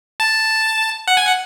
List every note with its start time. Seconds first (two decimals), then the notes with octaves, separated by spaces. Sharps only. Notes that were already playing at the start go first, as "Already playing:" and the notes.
0.20 A5
1.08 F#5
1.17 G#5
1.27 F#5